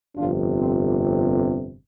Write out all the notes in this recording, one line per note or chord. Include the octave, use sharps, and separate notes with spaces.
G1 F2 C3 F3 D4 F4
C4
C4